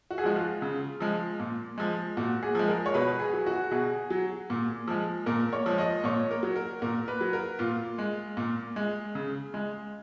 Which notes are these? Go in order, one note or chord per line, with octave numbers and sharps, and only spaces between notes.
F#4
G#4
F3 G#3 F#4
F4
C#3
F3 G#3
A#2
F3 G#3
A#2 F#4
G#4
F3 G#3
A#4
C#5
B2 B4
G#4
F#3
F#4
B2 G#4
F#3
A#2
F3 G#3
A#2 A#4
C#5
F3 G#3
D#5
A#2 C#5
A#4
F#3
A#4
A#2 A#4
B4
F#3
A#4
A#2 F4
G#3
A#2
G#3
C#3
G#3